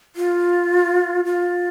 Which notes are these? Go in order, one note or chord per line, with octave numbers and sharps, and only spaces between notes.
F4
F4